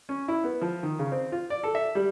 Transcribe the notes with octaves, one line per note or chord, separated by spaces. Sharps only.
C#4
E4
B3
F3
D#3
C#3
C4
F4
D5
A4
E5
G3